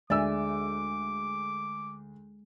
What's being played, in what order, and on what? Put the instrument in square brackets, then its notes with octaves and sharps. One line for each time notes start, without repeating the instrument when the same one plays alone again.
[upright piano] D2 E6 [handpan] G#3 [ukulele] D5 E5 G#5 [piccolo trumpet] D6